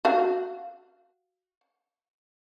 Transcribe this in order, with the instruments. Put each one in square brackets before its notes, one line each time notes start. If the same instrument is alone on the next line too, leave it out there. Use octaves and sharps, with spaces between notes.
[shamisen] F#4 F5